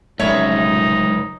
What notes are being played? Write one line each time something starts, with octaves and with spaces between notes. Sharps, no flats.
F1 C#2 F#2 C#3 A3 D#4 C#5 E5